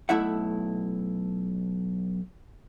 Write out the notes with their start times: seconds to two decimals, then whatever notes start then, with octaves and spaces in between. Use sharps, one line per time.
0.09 B1 A3 E4 E5 F#5